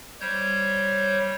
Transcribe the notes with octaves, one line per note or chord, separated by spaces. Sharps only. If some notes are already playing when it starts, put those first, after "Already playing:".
G3 C5 C#5 G6